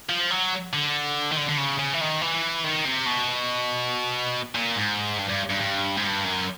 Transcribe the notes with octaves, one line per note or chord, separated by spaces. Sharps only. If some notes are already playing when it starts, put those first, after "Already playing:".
F3
F#3
D3
D#3
D3
D3
C#3
C#3
E3
D#3
E3
D#3
C3
B2
A#2
G#2
G2
G2
G2
G2
G#2
G2
F#2